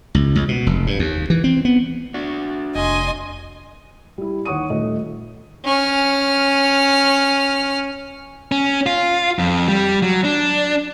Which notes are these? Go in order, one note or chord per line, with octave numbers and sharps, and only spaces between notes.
C#2
C#2
B2
F1
G2
D#2
E3
C4
B3
D4 F#4
F1 D#5 G#5 C6
G3 E4
D#2 C#5 F#5 C#6 D#6 D#7
D#1 A3 D#5
C#4 F6
C#4
F4
F2
G3
F#3
D4